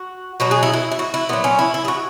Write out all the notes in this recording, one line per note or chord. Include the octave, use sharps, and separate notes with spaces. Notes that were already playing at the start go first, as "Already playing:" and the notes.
Already playing: F#4
B2 F#3 F#4
G#4
E4
E4
E4
F#4
E4
A#2 F#3 B3
C#4
E4
E4
G#4
F#4